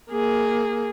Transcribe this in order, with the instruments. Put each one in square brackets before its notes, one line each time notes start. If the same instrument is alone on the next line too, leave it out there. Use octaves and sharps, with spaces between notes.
[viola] A#3 G#4